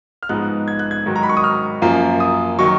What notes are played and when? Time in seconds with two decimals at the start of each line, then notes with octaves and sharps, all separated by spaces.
0.23 F6
0.29 G#2 F3 G#3 B3 D#4 F#6
0.68 G#6
0.79 F#6
0.91 G#6
1.06 G#2 D#3 F#3
1.16 A#5
1.23 B5
1.29 C#6
1.37 D#6
1.44 F6
1.82 F#2 F3 A#3
2.20 D#6
2.59 D#3 F#3 C#6